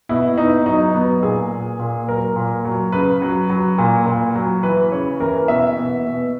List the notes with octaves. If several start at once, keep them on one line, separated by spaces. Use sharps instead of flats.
B2 E4
B2 D#4
F#3 D#4
F#3 B3
A#2 G#4
A#2
A#2
F#3 A#4
A#2
F#3
C#3 B4
F#3
F#3
A#2
A#2
F#3
E3 B4
C#3 C#5
E3 A#4
B2 E5
B2
B2